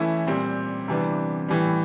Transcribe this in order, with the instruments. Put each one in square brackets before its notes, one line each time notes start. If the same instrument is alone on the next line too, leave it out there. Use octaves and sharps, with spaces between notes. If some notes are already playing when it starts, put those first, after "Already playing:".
Already playing: [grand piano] E3 A3 C#4 E4
A#2 G3 C4
C3 E3 G3 B3 D4
A2 E3 G3